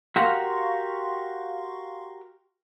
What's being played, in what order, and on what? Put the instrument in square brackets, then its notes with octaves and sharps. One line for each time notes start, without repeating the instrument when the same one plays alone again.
[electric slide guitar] F#4 G4 A#4 [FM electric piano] F5 C6 C#6